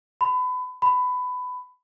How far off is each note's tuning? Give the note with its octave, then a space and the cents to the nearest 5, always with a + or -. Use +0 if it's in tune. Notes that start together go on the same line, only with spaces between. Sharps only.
B5 +30
B5 +20